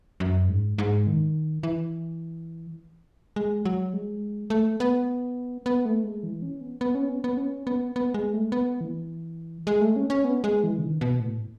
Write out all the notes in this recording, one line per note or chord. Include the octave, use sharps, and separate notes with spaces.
F#2
G#2
G#2
D#3
E3
G#3
F#3
G#3
A3
B3
B3
A3
G#3
E3
C#4
B3
B3
C#4
B3
B3
C#4
B3
B3
G#3
A3
B3
E3
G#3
A3
C#4
C#4
B3
G#3
E3
C#3
D#3
B2
A2